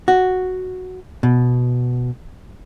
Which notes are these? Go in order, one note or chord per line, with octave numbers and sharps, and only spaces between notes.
F#4
B2